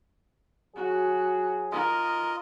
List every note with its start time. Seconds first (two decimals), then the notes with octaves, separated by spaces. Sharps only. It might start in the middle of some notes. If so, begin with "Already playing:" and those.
0.76 F#3 F#4 G#4
1.72 F4 A#4 D#5